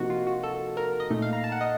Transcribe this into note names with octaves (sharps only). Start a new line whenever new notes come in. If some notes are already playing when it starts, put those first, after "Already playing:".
Already playing: C3 F3 A#3 D#4 F#4
F4
F#4
A4
A#4
D#5
A#2 A3 D#4
F5
A#5
A5
F#5
D#5